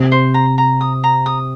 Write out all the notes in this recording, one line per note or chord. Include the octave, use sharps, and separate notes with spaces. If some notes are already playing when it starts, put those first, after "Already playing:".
Already playing: C3
C5
A#5
A#5
D#6
A#5
D#6